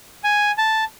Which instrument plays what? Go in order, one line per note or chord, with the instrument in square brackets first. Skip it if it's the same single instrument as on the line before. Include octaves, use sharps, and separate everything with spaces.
[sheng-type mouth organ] G#5
A5